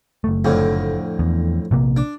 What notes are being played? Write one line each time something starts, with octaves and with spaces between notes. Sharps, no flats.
F#1 A3
F2 A2 D3
E2
A#1 C3 A#3
D4